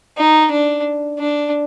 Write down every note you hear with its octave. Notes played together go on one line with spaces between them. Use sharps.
D#4
D4
D4